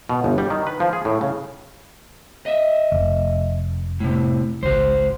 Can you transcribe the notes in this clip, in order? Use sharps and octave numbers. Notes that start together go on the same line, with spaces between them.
B2
G1
G3
D#3
B4
F3
G#4
A2
C#3
D#5 E5
F1
A2 C3
G#1 C#2 F#4 C5